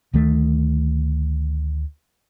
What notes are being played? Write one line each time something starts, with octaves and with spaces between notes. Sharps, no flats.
D2 D#3 A3